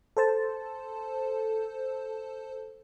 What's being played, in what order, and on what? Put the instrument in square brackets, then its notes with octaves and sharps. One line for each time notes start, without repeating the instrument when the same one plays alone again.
[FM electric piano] A4 C5 A5